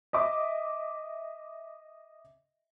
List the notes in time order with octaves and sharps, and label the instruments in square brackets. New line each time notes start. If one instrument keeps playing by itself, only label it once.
[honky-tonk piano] D#5 E5 D6